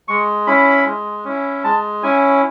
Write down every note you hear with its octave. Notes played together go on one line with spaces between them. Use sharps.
G#3 C#6
C#4 E4 B5
G#3
C#4 E4
G#3 A5
C#4 E4 G#5